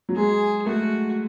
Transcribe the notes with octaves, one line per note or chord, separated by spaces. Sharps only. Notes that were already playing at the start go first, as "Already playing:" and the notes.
F#3
G#3 G#4
A3 F#4